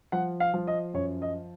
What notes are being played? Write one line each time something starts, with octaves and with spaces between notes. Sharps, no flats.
F3 F#5
F5
F3
D#5
F#2 C#5
D#5